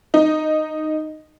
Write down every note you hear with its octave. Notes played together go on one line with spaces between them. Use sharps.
D#4